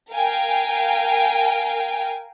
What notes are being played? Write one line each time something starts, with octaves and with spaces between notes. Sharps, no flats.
A#4 F5 G5 G#5